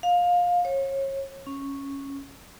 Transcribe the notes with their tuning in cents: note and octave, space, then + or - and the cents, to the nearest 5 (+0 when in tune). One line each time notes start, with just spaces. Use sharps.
F5 +20
C#5 -30
C#4 -5